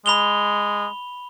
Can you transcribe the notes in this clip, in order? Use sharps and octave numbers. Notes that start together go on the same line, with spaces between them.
G#3 B5 F7 G7